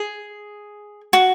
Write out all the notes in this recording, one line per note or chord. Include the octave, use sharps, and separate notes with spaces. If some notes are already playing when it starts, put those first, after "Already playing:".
Already playing: G#4
F#4